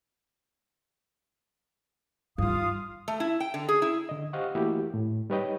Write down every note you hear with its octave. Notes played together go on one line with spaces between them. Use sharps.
G2 D#3 F4 F5 D#6
A3
E4
G5
D3
G#4
E4
D3 D#5
G4 C5 D#5 F5 F#5 C#6
E3 A3 A#3 E4 F#4 G4
A2
G3 D#4 B4 C#5 D#5 G5